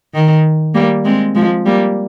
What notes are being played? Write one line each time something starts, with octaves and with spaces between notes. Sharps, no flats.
D#3
G3 A#3
G#3 C4
F3 G#3
G3 A#3